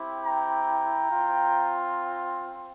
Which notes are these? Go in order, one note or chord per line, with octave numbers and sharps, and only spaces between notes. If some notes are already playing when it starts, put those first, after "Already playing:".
Already playing: C4 E4 G4
G5 A#5
C4 F4